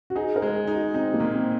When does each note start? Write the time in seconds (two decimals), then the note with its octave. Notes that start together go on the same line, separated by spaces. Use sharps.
0.10 F#4
0.16 D#4 G#4
0.36 A#4
0.42 G#3
0.55 G#4
0.67 D#4
0.74 F#4
0.94 C4 D#4
1.14 A#3
1.20 A#2
1.33 C4